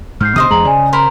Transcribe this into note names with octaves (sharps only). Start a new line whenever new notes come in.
G#2 F6 G6 C7
B2 D3 C5 D#5 D#6
E2 G#3 G#4 A#5 F#7
C#3 D5 G#5
A#4 C5 A#5 B5